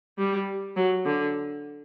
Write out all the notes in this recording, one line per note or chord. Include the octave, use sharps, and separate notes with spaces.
G3
F#3
D3